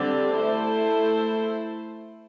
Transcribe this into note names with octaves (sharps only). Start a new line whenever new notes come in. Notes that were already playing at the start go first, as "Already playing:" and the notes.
Already playing: D3 G3 C4 G4 D5
A3 E4 A4 C5